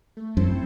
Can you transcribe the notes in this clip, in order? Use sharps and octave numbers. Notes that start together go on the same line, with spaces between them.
A3
F#2 C4 E4 A4 C5